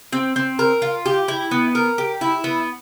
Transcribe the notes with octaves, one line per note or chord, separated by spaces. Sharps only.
C4
C4
A#4
F4
G4
E4
B3
A#4
G4
E4
B3